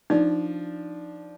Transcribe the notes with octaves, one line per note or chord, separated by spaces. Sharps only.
F3 D4 D#4